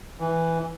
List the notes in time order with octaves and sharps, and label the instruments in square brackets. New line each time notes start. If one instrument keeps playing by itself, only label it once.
[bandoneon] E3